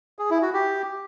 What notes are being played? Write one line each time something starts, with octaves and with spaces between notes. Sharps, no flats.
G#4
E4
F#4
G4